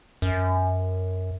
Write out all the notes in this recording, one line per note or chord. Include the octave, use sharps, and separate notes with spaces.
F#2